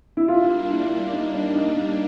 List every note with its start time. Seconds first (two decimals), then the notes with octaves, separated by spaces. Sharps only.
0.17 E4
0.28 G3 A#3 D4 F4
0.70 E4
1.13 D#4
1.34 D4
1.55 D#4